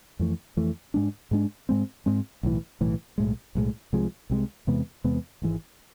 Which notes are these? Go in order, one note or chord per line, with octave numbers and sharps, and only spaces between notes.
F2 E3 A3
F2 E3 A3
G#2 G#3 D4
G#2 G#3 D4
G#2 G#3 C4
G#2 G#3 C4
B1 A2 E3
B1 A2 E3
B1 A2 G#3
B1 A2 G#3
C2 C3 F3 G#3
C2 C3 F3 G#3
E2 C3 G#3 B3
E2 C3 G#3 B3
G#1 G#2 E3 G#3